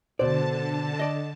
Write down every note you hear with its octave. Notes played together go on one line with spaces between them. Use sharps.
B2 D3 C5 D5 A5
D5 D#5